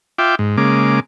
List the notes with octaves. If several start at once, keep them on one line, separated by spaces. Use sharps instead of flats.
F4 E5 G5 D6
G#2
C#3 G#3 A#3 D6